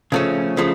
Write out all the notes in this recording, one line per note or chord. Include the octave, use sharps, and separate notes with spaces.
C#3 F3 A3 C#4
C#3 F3 A3